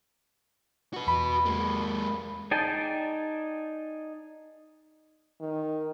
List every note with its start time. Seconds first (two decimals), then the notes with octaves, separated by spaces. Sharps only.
0.93 F#4 B4
1.07 E2 B5
1.45 G#3 A#3
2.51 D#4 G#4 D5 G5 A5
5.41 D#3